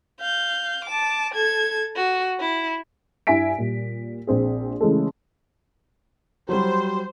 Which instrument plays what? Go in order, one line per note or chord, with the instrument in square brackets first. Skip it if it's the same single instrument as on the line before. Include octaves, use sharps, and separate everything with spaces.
[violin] F5 G6
A5 D6
A4 G#6
F#4
E4
[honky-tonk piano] G2 E4 E5 G#5 B6 D7
A#2 G3
A#1 C4 G#4
C#3 E3 G#3 A3
[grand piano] F#3 G3 [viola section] C5